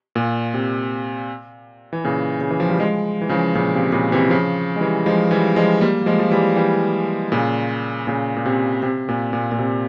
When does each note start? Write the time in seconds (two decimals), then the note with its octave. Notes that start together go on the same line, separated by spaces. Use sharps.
0.15 A#2
0.54 C3
1.93 E3
2.05 A#2 C#3
2.41 C#3
2.50 E3
2.60 F3
2.70 G3
2.79 F3 G#3
3.21 E3
3.29 C#3 F3
3.55 A#2 C#3
3.74 C3
3.92 A#2 C#3
4.12 C3 E3
4.30 C#3 F3
4.76 G#3
4.81 E3 G3
5.06 F3 G#3
5.31 E3 G3
5.56 F3 G#3
5.81 G3 A#3
6.02 A#3
6.06 F3 G#3
6.19 F3
6.31 E3 G3
6.56 E3 G3
7.32 A#2 C#3
8.07 A#2 C#3
8.36 A#2
8.46 C3
8.83 C3
9.09 A#2
9.33 A#2
9.52 A#2
9.59 C3